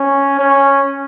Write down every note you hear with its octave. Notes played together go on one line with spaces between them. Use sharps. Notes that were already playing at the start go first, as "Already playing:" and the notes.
Already playing: C#4
C#4